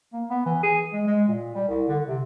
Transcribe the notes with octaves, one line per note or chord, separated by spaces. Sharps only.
A#3
B3
E3
G#4
G#3
G#3
A#2
G3
C2
D3
C3